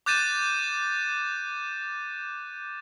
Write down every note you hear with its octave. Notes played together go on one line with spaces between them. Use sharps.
D6 F#6 G6 A6 D#7 E7